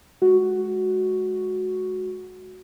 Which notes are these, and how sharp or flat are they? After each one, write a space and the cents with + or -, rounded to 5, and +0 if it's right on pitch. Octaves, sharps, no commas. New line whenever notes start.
G#3 +20 F#4 +0